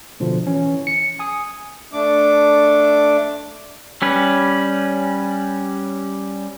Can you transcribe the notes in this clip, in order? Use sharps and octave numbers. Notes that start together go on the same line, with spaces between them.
B2 D3 F3
E3 C#4
C#7
G#5 D#6
A3 D4 D6
G3 C#4 B4